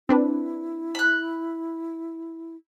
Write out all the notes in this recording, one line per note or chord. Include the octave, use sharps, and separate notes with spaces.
C4 D4 E4 B4
B5 F#6